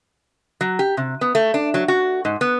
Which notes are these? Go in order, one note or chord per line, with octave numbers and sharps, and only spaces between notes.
F#3
G4
C3
B3
A3
D4
F#3
F#4
G#2
B3